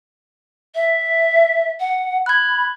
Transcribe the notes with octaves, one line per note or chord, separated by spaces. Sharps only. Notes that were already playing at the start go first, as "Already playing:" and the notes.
E5
F#5
B5 F#6 G#6